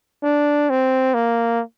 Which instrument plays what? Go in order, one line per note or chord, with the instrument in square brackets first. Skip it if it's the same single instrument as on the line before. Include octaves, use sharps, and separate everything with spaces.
[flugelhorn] D4
C4
A#3